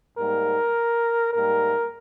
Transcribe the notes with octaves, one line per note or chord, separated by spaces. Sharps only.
G#2 G3 A#3 A#4
G#2 G3 A#3 A#4